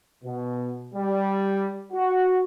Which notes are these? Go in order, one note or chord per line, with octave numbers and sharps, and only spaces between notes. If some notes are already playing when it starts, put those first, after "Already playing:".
B2
G3
F#4